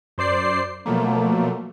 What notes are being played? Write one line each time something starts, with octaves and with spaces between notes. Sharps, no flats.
F#2 C5 D5 C7
B2 F3 F#3 A3 A#3